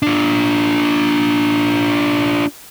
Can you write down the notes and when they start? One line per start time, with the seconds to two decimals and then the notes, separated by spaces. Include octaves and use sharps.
0.02 D4 F4